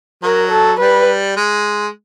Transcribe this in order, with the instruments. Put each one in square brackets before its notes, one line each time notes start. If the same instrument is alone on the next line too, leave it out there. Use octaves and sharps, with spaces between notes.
[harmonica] F#3 [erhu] A#4
[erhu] A4
[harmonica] G3 [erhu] B4
[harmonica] G#3